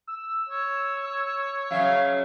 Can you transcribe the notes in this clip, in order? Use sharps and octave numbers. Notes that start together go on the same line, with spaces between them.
E6
C#5
C#3 F#3 E5 F5